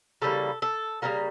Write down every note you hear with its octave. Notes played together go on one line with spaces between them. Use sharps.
C#3 E3 G3 A#3 A4
A4
C#3 E3 G3 A#3 A#4